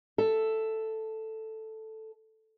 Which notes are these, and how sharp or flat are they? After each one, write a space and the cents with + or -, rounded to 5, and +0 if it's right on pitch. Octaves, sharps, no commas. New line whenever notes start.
A4 +0 E5 +10